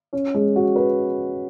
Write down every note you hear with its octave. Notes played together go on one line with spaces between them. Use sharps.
C#4
G#3
F#4
B4